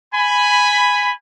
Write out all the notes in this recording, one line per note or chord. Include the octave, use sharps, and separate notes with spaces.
G#5 B5